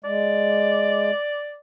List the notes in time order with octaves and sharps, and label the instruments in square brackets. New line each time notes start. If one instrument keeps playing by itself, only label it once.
[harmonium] G#3 [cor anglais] D5